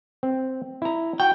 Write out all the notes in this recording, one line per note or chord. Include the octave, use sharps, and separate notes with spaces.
C4
E4 A#5
F#4 G5